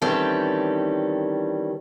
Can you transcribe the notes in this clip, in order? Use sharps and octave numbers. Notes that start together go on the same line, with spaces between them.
D#3 E3 G3 C4 C#4 A4